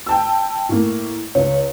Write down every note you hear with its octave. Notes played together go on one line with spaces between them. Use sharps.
G5 A5 E6
A2 A#3
C#2 C#5